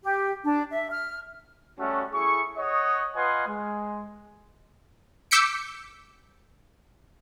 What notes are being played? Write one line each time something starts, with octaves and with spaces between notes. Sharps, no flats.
G4
D4
E5
F6
G3 A3 C#4 F#4
A3 E4 G#4 C#6
C#5 D#5 F#5 C#6 D#6
F4 B4 D#5 F#5 G#5 C6
G#3
D6 E6 G6 B6 C#7 D7